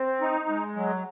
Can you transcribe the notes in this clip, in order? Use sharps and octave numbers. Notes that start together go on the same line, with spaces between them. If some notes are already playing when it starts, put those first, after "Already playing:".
Already playing: C4
D#4
G#3
F#3